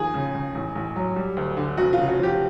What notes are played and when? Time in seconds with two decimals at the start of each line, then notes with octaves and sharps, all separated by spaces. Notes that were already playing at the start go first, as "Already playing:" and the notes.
Already playing: D#2 F3 G#4
0.14 C#3
0.35 C#3
0.55 A1
0.75 A1
0.96 F#3
1.16 G3
1.37 D2
1.57 D3
1.77 F1 F#4
1.93 F4
1.98 C#3
2.08 F#4
2.18 F3 G4